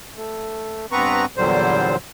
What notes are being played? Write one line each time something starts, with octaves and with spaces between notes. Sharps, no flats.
A3
G2 B3 C4 B4 A#5 C#6
E2 A#2 D3 F#3 G3 C5